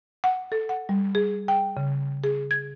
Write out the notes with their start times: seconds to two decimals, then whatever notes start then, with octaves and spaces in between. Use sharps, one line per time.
0.24 F#5
0.52 A4
0.69 F#5
0.89 G3
1.15 G#4
1.48 G5
1.77 C#3
2.24 G#4
2.51 G#6